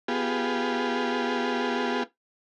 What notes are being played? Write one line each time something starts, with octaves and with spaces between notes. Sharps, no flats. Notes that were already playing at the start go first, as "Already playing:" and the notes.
B3 F4 G4 G#4